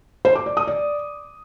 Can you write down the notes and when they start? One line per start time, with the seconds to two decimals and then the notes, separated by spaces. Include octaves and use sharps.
0.25 C5
0.35 D6
0.46 D5
0.57 D#6
0.67 D5